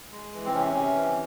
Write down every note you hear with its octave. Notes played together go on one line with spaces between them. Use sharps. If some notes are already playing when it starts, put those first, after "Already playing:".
G#3
E3
C4
C3 C#4
C3
E3